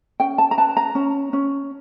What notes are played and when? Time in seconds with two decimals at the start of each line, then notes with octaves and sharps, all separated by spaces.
0.20 C#4 G5
0.38 A5
0.51 A#5
0.58 B4 A5
0.77 A#5
0.95 C#4
1.33 C#4